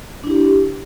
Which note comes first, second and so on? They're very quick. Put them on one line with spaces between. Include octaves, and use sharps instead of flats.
D4 E4 G4